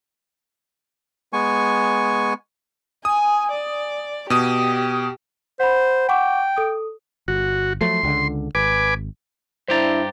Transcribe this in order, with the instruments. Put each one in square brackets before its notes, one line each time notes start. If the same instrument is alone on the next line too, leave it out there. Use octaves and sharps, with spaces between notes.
[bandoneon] G#3 B3 G#5 C#6
[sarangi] G#5 [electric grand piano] D#6
[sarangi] D5
[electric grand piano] B2 D#6 [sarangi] G4
[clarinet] C5 [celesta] F#5 B5
[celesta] F#5 C#6 D6 [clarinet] G5
[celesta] A4 D#6
[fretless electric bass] G1 [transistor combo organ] F#4
[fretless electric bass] F3 F#3 A3 [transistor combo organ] C6
[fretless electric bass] C#2 D3
[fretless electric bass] G#1 [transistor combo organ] B4 G#5 D6
[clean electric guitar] G2 G4 A#5 [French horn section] D4 E4 [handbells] C5 A6